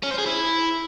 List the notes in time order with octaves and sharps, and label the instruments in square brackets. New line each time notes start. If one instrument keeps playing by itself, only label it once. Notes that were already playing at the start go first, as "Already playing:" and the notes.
[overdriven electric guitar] C#4
C5
G#4
E4